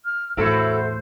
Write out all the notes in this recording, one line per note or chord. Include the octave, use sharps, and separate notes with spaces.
F6
E2 A2 E4 F#4 A4 C5